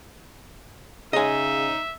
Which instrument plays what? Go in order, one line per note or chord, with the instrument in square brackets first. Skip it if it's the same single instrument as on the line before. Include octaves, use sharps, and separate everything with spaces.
[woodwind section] C#3 [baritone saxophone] D#4 [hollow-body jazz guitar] D#5 G#5 [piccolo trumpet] E5